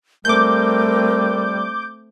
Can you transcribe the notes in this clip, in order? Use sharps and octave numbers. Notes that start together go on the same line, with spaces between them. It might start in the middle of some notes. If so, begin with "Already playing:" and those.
G3 A3 C4 A#4 D6 G6